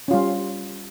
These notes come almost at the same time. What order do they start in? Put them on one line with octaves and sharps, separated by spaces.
C#4 F4 G3